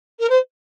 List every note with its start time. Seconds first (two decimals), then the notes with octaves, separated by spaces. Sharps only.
0.19 A#4
0.29 C5